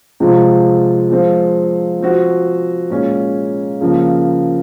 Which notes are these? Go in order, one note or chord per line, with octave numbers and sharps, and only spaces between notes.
C3 F3 G#3 C4 F4
F3 G#3 C4 F4
F3 C4 F#4
A#2 G#3 C#4
C#3 F3 A#3